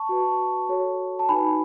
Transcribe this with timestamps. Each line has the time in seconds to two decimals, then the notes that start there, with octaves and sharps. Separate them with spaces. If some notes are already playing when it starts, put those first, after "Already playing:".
Already playing: A5 C#6
0.09 F#4 B4
0.69 F#4 A4 C#5
1.19 A5
1.29 D#4 F#4 B4 G#5 B5